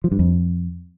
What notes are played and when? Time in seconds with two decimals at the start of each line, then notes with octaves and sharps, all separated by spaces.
0.04 F3
0.12 G2
0.19 F2